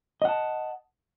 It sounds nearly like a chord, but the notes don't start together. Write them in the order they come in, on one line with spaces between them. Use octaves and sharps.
D#5 F#5 A5